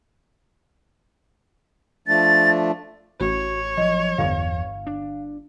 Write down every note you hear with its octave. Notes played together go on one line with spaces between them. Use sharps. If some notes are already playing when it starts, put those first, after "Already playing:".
F3 A3 D4 A6
A1 F#4 C#5
F3 F#3 D#5
G1 E2 F5
D4